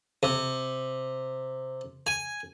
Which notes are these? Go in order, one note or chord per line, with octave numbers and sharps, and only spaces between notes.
C3
G#5